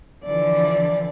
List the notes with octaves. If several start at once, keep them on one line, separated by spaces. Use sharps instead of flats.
D3 E3 F3 D5